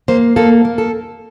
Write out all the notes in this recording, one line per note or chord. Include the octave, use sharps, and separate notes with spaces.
A#3 C5
A#3 A4
A#3
A4